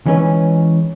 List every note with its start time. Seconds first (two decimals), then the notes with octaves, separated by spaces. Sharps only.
0.06 E3 G#3 C#4 D#4 B4